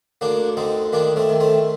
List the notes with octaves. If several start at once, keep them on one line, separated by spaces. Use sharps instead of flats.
D2 A#3 D4
D3 C4 D#4
D#3 A#3 D4
A3 C4
D#3
A3 C4